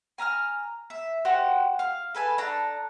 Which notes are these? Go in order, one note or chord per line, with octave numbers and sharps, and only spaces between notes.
G#5 A#5 E6 F6
E5
F#4 G4 C5 F#5
F5
A4 B4 G#5 A5
D4 A4 A5 A#5